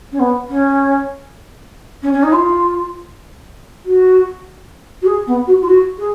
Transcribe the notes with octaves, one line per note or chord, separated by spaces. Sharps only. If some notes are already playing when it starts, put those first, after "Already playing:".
C#4
B3
C#4
C#4
C#4
D#4
F4
F#4
F#4
G#4
B3
F#4
F4
F#4
G#4